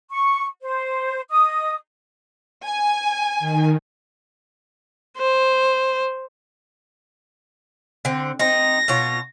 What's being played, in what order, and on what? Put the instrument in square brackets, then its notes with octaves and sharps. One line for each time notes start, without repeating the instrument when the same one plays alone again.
[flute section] C#6
C5
D#5 D#6
[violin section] G#5
[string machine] D#3
[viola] C5
[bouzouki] D3 C4
[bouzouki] C4 D#4 [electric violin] A#6
[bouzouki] B2 F4 C#5